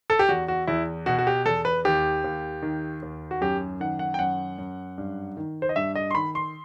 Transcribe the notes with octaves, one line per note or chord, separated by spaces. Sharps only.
A4
G4
E2 F#4
F#4
E2 E4
B2 F#4
F#4
G4
E2 A4
B4
D#2 G4
D#2
D#3
D#2
F#4
F#2 G4
D#3 F#5
F#5
G5
F#2 F#5
F#2
G2
D#3
C5
D#5
G2 E5
D#5
C6
D#3 B5
C6